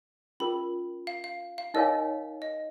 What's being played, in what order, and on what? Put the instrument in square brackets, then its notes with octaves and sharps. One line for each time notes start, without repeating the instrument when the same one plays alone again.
[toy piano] C#4 F4 A#4 [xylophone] B5
[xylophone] F5
F5
F5
[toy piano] D#4 A#4 C#5 F5 G#5 [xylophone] D#5
[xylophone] D#5